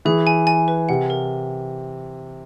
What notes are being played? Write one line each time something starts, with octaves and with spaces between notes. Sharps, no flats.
E3 G#4
G#5
G#5
B4
C3 F#5
A#4